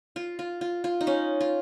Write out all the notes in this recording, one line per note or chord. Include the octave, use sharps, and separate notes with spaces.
F4
F4
F4
F4
D#4
C#4
F4